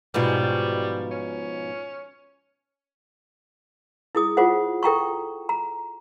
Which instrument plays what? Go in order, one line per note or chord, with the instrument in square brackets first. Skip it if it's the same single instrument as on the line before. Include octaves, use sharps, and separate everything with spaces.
[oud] G#2 B2 F3 [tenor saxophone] G3
[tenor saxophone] C#4
[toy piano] E4 G#4 D#6
F4 G#4 C5 F#5
A4 G5 A#5 C#6
A#5